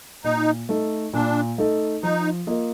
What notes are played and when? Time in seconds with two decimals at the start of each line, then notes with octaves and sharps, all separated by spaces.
0.24 A#2 D#4
0.69 A3 D#4 A4
1.13 A#2 D4
1.58 A3 D#4 A4
2.03 F3 D#4
2.47 A#3 F4 A#4 D#5